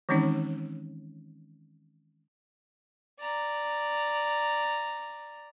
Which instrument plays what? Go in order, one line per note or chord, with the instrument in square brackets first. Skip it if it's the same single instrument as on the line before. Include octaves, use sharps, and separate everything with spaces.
[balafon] D#3 E3 G#3 C4 C#4 D#4
[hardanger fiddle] D5 A#5